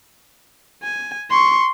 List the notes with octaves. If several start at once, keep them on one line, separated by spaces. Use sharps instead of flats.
G#5
C6 C#6